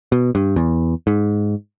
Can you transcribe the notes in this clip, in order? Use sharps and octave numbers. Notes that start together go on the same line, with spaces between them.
B2
G2
E2
G#2